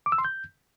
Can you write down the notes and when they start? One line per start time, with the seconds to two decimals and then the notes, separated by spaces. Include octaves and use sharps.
0.06 D6
0.12 E6
0.18 C6
0.25 G6